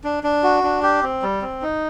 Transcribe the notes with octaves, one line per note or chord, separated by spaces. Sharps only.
D4
D4
F#4
D4
G4
C4
G3
C4
D#4